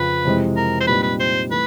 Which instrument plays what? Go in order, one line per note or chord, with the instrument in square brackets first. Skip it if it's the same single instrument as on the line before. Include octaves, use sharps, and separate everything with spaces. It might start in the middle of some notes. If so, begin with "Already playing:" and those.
Already playing: [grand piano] F2 C#3 F3 [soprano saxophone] B4
[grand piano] F2 C3 E3 G#3
[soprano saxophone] A#4
C5
[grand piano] A#2 G3 C4 D#4 [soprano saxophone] B4
[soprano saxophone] B4
C5
[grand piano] E3 A3 [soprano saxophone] B4